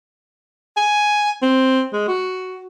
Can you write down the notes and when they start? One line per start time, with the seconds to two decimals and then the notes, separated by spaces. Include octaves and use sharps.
0.77 G#5
1.42 C4
1.93 G#3
2.08 F#4